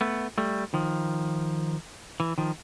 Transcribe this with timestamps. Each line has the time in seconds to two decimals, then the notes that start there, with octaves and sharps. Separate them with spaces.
0.01 A3 B3
0.38 G3 A3
0.74 D#3 F3
2.20 E3
2.38 D#3 F3